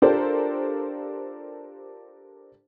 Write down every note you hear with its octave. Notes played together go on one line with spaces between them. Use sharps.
D4 F4 G4 A4 A#4 C5